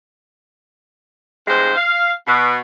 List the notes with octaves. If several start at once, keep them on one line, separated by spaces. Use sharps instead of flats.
E2 G2 G#3 C5
F5
B2